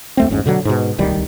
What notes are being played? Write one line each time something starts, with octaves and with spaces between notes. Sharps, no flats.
D#2 A3 C4
G#1 E2 G#2 C#4
B2 D3 F3 F#3
G#2 B2
D1 C2 D#3 G3